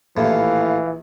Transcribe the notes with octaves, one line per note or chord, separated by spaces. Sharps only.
A#1 D#2 A2 E3 F5